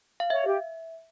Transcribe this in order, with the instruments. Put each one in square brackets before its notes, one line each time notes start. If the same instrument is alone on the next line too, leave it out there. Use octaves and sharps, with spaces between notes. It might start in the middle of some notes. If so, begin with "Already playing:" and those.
[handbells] F5
[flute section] C#5 [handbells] E5
[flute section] G4